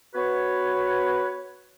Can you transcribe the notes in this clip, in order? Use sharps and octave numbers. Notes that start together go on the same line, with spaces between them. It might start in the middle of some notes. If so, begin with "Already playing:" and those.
B3 F#4 B4 C#5